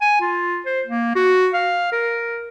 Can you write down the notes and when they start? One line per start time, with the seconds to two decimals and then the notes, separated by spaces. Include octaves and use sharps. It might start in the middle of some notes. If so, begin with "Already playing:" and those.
0.01 G#5
0.21 F4
0.66 C5
0.86 A#3
1.16 F#4
1.54 F5
1.92 A#4